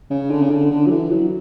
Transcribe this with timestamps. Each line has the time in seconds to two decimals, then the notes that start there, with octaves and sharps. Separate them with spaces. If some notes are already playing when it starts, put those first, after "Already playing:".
0.10 C#3
0.31 D3
0.42 C#3
0.50 D3
0.71 D3
0.86 F#3
0.91 E3
1.11 F#3